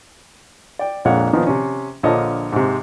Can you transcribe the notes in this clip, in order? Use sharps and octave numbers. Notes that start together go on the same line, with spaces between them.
D5 G5
A#1 F2 A#2 G#3 C#5 F#5
A#2 D#3 F3 B3
C3 C#4
A#1 D3 F3 C#5 D#5 A5
G#2 C3